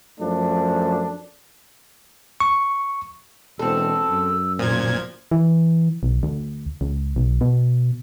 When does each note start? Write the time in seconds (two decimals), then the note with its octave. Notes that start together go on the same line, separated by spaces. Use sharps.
0.20 F#2 F3 A3 D4
2.40 C#6
3.59 E1 C4 A4 E6
4.09 F#2
4.59 A#2 F3 F4 G#6
5.31 E3
6.03 B1
6.23 D2
6.81 C#2
7.16 B1
7.41 B2